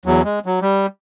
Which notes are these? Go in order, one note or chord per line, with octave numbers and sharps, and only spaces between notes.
E2 F#3
G#3
F#3
G3